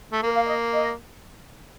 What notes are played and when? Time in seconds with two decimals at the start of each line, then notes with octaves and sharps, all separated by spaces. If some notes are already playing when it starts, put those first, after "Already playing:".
0.12 A3
0.23 A#3 A#4
0.34 F5
0.46 D#5
0.73 D#5